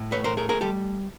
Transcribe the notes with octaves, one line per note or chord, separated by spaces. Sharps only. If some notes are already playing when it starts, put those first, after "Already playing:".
Already playing: A2
A3 B4 C#5
A#4 C5
A3 G#4 A#4
G#4 A#4
G3 G4 A4